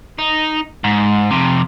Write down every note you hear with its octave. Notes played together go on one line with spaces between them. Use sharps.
D#4
G#2
F2 C3